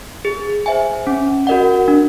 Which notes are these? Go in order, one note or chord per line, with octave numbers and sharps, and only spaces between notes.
G#4
C5 E5 G#5
C#4
F#4 A#4 D#5 F#5
D4